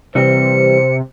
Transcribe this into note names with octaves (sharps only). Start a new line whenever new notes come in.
C3 E3 G3 C4 C5 C#7